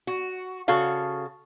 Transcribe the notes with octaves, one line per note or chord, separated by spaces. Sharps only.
F#4
C#3 F#4 A4 F5